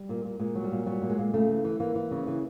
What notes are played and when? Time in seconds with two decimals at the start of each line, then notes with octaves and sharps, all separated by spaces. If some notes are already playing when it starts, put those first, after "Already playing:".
Already playing: G3
0.09 A#2
0.25 A#2
0.39 A#2 G#3
0.55 F#3
0.64 G3
0.72 A#2
0.86 F#3 G3
1.02 A#2
1.10 G#3
1.18 A#2
1.34 C#3 A3
1.49 E3
1.64 E3
1.80 E3 A#3
1.95 E3
2.11 C#3
2.27 E3